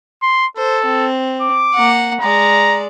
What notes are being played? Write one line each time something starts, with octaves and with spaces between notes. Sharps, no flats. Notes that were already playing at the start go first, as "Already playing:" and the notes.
C6
A4 C5
C4
D6
A#3 F#5
G#3 D5 A#5